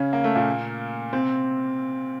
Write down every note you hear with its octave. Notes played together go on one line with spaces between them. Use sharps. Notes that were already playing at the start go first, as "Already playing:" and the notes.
Already playing: C#3 C#4
A#3
A3
A#2 A#3
C3 C4